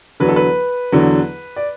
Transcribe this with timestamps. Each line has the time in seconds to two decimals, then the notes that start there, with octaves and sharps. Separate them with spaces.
0.20 E2 D3 F#3 B4
0.29 A4
0.36 B4
0.92 E2 D3 F#3
1.56 D5